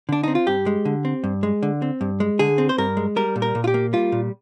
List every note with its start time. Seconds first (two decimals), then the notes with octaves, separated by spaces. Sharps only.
0.09 D3 D4
0.23 C4 D#4
0.35 F4
0.47 G2 G4
0.66 G#3
0.85 D3
1.05 C4
1.24 G2
1.43 G#3
1.63 D3
1.82 C4
2.01 G2
2.20 G#3
2.39 D3 G#4
2.58 C4
2.69 C5
2.78 G2 A#4
2.97 G#3
3.16 G3 A#4
3.36 A#2
3.42 A#4
3.55 A#2
3.64 F4
3.67 G4
3.74 A#3
3.93 G3 F4
4.12 A#2